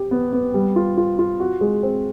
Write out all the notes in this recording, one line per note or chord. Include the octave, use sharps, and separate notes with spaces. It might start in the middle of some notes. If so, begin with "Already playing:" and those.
Already playing: G4
B3
B3
G3
F4
F4
F4
F#4
G#3
C4